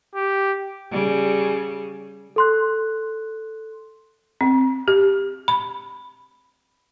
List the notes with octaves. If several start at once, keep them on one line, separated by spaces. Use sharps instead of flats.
G4
C#3 G3
A4 C6 F#6
C4
G4
B5